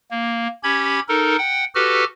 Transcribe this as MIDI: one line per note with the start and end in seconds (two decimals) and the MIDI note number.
0.11 0.48 58
0.63 1.00 61
0.63 1.00 67
0.63 1.00 83
0.63 1.00 92
1.08 1.36 63
1.08 1.36 69
1.08 1.36 70
1.38 1.65 78
1.38 1.65 79
1.75 2.04 66
1.75 2.04 67
1.75 2.04 69
1.75 2.04 71
1.75 2.04 89